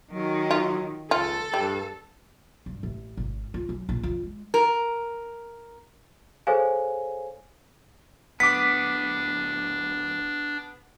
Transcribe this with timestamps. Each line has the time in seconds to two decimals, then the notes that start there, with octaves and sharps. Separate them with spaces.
0.12 D#3 F#3
0.51 F4
1.11 C#2 F4 A4
1.54 G2 G3
2.66 G2
2.83 A1
3.17 G#1
3.54 F4
3.69 F#2
3.89 A#1
4.03 F2
4.23 G#3
4.54 A#4
6.47 G#4 A4 C5 C#5 F5 G#5
8.40 D1 B3 D4 D6 B6